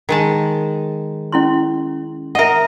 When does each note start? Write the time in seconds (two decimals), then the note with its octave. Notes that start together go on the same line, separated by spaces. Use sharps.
0.09 D#3 G#3 A5
1.32 C#4 E4 C6
2.35 A#4 D#5 E5 F#5